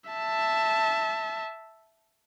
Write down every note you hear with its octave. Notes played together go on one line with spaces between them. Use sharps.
E5 A5